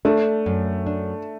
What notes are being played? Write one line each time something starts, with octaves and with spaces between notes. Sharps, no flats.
A3 D4
F#2
D4